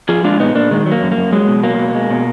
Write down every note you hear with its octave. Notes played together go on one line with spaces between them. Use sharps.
F3 F4 G#4
G#3 D4 F4
A#2 B3 D#4
A#2 A#3 D4
D#3 G#3
F#3
A#3
F#2
A#3
F#2
F#3 G#3
B2
F#3 A#3
B2
G#3
B2